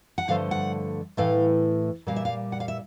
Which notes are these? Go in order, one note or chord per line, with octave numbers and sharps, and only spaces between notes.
F#5
G2 D3 F3 A3 F5
F#5
A2 E3 A3 F5
A#2 G3 A#3 F5
E5
F5
F#5
F5
E5